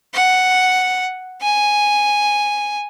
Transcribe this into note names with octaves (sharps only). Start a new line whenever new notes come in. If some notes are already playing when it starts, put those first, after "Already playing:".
F#5
G#5